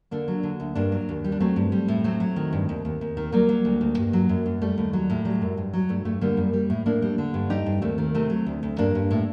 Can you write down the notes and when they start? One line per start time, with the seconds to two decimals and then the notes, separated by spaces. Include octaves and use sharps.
0.11 D3 A#3 D4
0.28 F#3
0.43 D3
0.60 D2
0.75 G2 A#3 D4
0.92 F#3
1.09 D#2
1.24 G3
1.32 D4
1.40 F#3 A3 C4
1.56 G2
1.72 G3
1.88 A2
2.04 F#3 A3 C4
2.20 F#3
2.36 D#3
2.53 G2
2.69 D#2
2.85 D#2
3.01 D#2
3.17 D#3
3.32 F#3 G3 A#3
3.49 F#3
3.65 D2
3.81 D2
3.97 G2
4.13 F#3
4.29 F#2
4.46 F#2
4.61 G3 A3
4.78 D#2
4.93 F#3
5.10 A2
5.25 F#3 G3
5.41 F#2
5.57 G2
5.73 F#3
5.89 G2 A3
6.05 G2 A3
6.21 D3 G3 A#3
6.37 F#2
6.53 G3
6.70 A2
6.86 A2 A#3 D4
7.02 G3
7.18 D3
7.34 G2
7.50 G3 D#4 G4
7.66 G2
7.82 D#2 A3 C4
7.98 D#3
8.14 C3 A3 C4
8.30 F#3
8.46 D2
8.63 D2
8.78 G2 A#3 D4
8.95 G2
9.11 A2